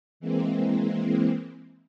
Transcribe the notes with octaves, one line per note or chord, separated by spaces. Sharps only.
E3 G#3 A#3 C4